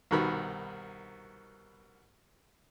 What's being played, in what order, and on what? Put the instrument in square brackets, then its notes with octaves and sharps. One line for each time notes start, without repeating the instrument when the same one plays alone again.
[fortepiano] C2 B2 D#3 B5